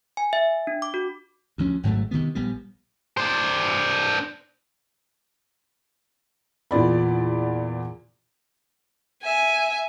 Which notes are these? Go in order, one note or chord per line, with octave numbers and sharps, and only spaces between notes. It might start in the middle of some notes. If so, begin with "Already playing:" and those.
G#5
E5
D4
D6
F#4
D2 F3 C#4
G#1 G#2 F#3 A3
C3 D#3 F3 B3
A#1 G3 B3
D4 C5
E2 A#2 D5 B5
E5 G#5